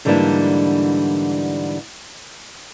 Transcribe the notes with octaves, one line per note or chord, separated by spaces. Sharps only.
G#2 D3 E3 G3 A#3 D4